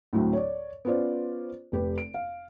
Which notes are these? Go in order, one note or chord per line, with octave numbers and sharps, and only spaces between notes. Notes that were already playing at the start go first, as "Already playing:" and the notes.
D2 A2 F#3 C4
C#5 D5
B3 C#4 F4 C5 D5
F1 G4 B4
D7
F5